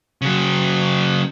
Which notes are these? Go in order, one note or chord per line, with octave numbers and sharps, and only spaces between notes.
C#3 F#3